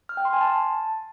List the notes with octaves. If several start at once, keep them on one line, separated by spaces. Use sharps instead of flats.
F6
G5
C6
G#5
A5